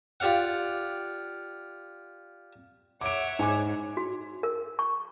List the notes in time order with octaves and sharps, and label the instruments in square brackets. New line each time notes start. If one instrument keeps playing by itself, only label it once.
[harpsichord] F4 G4 D5 F5 F#5
[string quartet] C#5 E5 F#5 [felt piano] D6 D7
[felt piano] G#2 G#5 D6
[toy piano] F#4
A#4
C#6